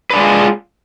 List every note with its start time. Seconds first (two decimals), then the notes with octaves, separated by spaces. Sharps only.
0.10 B4
0.13 D4
0.16 G#3
0.19 F4